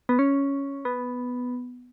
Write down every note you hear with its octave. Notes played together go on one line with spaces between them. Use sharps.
B3
C#4
B3